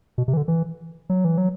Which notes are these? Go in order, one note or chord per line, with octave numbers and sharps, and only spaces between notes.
B2
C3
E3
D3
E3
F#3
E3
F#3